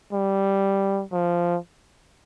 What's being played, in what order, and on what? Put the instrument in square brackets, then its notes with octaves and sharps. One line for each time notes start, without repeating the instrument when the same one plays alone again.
[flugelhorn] G3
F3